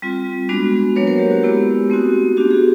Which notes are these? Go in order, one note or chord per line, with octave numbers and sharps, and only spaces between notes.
G3 C4 F4
G#3 B3 D4 F#4
F#3 A#3 D4 F#4 B4 C#5
A#4 C5
G4
F#4
G#3 B3 E4 G4
A3 C4 D#4 F#4
B3 D4 F#4 G4
G#4